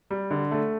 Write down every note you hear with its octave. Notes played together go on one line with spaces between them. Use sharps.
G3
D3
A3